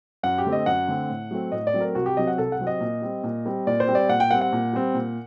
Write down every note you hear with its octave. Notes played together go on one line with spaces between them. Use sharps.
F#2 F#5
G4
D3 A3 C4
D#5
F#2 F#5
D3 A3 C4
A2
F#3 A3 C4
A2 D#5
D5
F#3 A3 C4
A#4
C2 F#4
G4
C3 F#3 C4 D#5
F#5
C2 A4
F#5
C3 F#3 C4
D#5
A#2
G3 C4
A#2
G3 C4
A#2 D5
C5
G3 C4
D5
A#2 F#5
G5
G3 C4 F#5
F#5
A#2
G3 C4
A#2